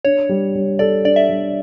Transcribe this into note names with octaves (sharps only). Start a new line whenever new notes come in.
D4 C#5
G3
G3
A4 D5
D4 D5
E5
G3